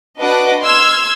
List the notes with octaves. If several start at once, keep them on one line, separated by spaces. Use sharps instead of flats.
D4 F#4 B4 D#5 F#5 D6
C6 E6 F6 G#6